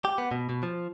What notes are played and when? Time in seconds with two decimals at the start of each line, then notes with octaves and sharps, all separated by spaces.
0.05 G4
0.18 B3
0.31 B2
0.49 B2
0.63 F3